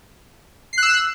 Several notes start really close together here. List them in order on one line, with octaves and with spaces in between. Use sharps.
C7 F#6 E6